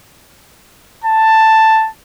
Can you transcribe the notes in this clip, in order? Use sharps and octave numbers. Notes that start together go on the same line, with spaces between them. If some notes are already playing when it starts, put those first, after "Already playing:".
A5